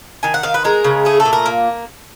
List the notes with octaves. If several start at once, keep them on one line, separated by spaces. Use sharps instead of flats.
D#3 G#5
F#5
D#3 F5
B4
G#3 A#4
C#3
A3 G#4
A4
A#2
A#4
A#3